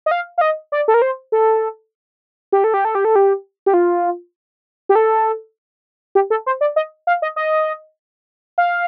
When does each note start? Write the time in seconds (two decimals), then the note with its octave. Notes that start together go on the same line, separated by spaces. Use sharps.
0.06 D#5
0.11 F5
0.38 F5
0.41 D#5
0.72 D5
0.88 A4
0.94 A#4
1.02 C5
1.32 A4
2.52 G4
2.64 A4
2.74 G4
2.85 A4
2.95 G4
3.05 A4
3.16 G4
3.66 G4
3.74 F4
4.89 G4
4.95 A4
6.15 G4
6.30 A4
6.46 C5
6.61 D5
6.76 D#5
7.07 F5
7.22 D#5
7.36 D#5
8.58 F5